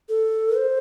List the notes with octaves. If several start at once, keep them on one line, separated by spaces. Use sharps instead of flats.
A4
C5